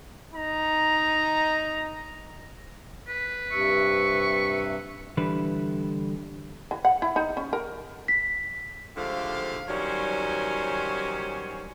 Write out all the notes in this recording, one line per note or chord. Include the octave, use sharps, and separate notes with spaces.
D#4 A#5
B4
G2 C3 E5 C#6
D3 E3 G3 E4 B4
E3
F#5
E4
D#4
C#4
A#4
B6
G#2 D3 F3 A3 G4 F5
D#3 F#3 G3 C#4 C5 G#5